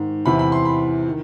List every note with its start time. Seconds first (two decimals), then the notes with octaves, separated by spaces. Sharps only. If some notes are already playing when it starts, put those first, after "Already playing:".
Already playing: G#2 D#3
0.26 E2 C3 E3 B5
0.39 B5
0.52 C6
0.65 B5
1.08 D#3